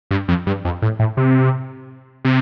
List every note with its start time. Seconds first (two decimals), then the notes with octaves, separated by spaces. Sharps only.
0.11 G2
0.28 F2
0.47 G2
0.65 F2
0.82 A2
0.99 A2
1.17 C3
2.25 C3